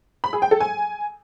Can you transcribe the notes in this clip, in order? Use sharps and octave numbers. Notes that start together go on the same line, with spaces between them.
B5
G#4
G5
A4
G#5